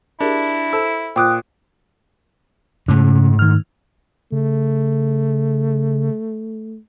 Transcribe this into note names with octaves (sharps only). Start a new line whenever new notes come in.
D4 E4 G4 G#4 A#4
A4 C5 A5 E6
A#2 F4 C5 G5 D6 D#6 F#6
G#2 C#3 A3
D#3 F6
C#3 A3